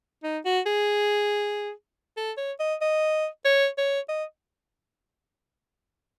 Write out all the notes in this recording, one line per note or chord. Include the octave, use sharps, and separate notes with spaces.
D#4
F#4
G#4
A4
C#5
D#5
D#5
C#5
C#5
D#5